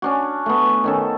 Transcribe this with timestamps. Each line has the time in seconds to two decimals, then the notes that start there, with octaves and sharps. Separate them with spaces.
0.02 C#4 D4 F#4
0.46 A3 B3
0.84 D#3 C#4 A4